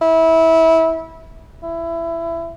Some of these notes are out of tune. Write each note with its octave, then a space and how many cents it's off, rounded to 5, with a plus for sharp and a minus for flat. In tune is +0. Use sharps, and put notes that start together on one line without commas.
E4 -20
E4 +20